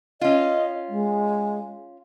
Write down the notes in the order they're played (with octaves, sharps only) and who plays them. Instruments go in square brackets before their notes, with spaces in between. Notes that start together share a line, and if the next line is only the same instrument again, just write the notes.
[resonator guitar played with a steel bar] C#4 F4 [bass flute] D#5
[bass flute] G#3